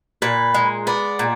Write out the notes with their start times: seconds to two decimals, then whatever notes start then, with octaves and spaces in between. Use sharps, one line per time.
0.22 A#2 B4
0.54 G#3
0.87 B3 D5
1.19 A#2